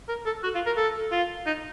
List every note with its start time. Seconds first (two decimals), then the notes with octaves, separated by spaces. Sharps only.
0.09 A#4
0.26 A4
0.44 F#4
0.55 F4
0.66 A#4
0.77 A4
1.12 F4
1.46 D#4